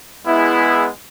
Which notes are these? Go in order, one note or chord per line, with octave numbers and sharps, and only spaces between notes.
G#3 B3 E4 G#4